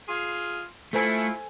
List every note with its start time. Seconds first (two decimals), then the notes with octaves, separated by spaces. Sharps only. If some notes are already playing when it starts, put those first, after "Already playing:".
0.08 F4 G#4
0.93 A3 E4 F4 A4 C5 G#5